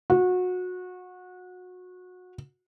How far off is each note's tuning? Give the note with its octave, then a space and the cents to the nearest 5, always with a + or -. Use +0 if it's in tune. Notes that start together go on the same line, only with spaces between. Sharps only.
F#4 -25